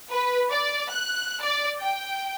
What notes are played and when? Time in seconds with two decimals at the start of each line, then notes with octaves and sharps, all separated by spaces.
0.11 B4
0.50 D5
0.90 F#6
1.41 D5
1.80 G5